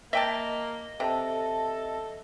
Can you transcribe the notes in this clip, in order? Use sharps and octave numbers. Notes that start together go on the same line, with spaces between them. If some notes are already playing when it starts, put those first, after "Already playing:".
A#3 D#5 E5 G5 A5
C3 A4 E5 A5